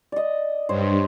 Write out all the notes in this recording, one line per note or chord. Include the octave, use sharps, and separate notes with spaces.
D5 D#5
G2 C5 C#5